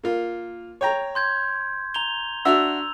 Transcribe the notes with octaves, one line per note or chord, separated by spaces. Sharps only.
A#3 F4
C#5 G5 A#5
C6 G6 G#6
A#5 F7 G7
D4 F#4 E5 E6 F7